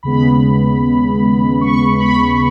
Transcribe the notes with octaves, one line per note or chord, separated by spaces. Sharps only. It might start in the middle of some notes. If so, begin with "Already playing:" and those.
D#2 C#3 G#3 B3 B5
C#6
B5